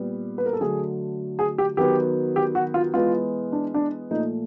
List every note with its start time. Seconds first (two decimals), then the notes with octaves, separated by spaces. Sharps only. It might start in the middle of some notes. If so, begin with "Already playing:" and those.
Already playing: A#2 G3 B3
0.38 B4
0.46 A#4
0.53 A4
0.60 D3 F#3 A3 G#4
1.39 G#4
1.58 G4
1.77 D#3 F#3 B3 G4
2.36 G4
2.55 F#4
2.74 F4
2.94 E3 G#3 B3 F4
3.52 D4
3.74 D4
4.11 A#2 F3 A3 D#4